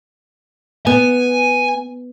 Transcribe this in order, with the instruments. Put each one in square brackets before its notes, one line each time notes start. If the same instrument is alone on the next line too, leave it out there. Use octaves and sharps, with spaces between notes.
[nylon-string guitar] B3 [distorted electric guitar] G#5